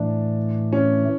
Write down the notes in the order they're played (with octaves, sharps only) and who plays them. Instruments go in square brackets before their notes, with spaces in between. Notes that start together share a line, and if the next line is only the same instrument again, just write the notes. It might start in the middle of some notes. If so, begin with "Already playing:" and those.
Already playing: [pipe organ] A2 E3 A3 [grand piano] D4
[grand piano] C#4